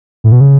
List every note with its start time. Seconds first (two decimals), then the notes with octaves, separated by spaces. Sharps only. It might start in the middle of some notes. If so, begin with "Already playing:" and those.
0.24 A2
0.32 B2
0.41 C#3